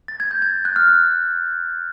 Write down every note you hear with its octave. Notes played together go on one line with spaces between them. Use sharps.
A6
G#6
G6
G#6
F#6
F6